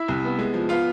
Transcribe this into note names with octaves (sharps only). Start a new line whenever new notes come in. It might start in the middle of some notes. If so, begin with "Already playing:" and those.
Already playing: E4 E5
C2
B3
G#3
F3
B3 F4 F5